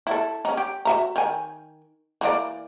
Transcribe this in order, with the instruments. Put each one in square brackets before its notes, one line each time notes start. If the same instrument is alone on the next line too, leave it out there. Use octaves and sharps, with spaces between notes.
[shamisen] E4 A4
C#4 D#4
G4
F#4 E5 A#5
D#3 G#5
E3 A#3 D5